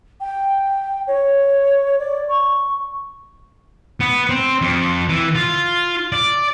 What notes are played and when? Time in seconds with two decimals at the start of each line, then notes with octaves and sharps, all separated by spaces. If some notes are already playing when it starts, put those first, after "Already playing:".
0.20 G5
1.07 C#5
1.99 D5
2.28 C#6
4.00 B3
4.29 C4
4.62 F2
5.09 E3
5.35 F4
6.12 D5